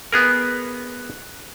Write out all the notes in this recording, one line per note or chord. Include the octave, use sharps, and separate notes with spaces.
B3 G#4 A#4